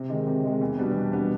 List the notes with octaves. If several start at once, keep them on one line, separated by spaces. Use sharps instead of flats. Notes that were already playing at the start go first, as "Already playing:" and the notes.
Already playing: C3
D#3 G#3
C3
D#3 G#3
E2
B2 G3 B3 D4
E2
B2 G3 B3 D4